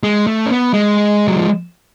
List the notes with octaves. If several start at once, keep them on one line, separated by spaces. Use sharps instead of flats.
G#3
A3
C#4
B3
G#3
F#3
F3